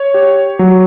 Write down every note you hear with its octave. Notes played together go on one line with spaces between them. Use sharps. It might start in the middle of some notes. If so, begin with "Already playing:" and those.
Already playing: C#5
G4
F#3